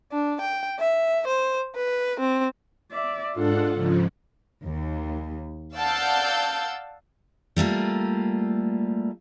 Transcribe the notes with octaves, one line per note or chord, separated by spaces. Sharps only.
D4
G5
E5
C5
B4
C4
D5 E5
G#2 D4 F4 A4 F#5
G#2 C#3 F3
D#2
D5 F5 F#5 A5 E6 G6
G3 A3 A#3 F4